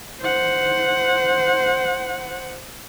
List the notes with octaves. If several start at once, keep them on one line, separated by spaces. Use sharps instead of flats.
C5 F#5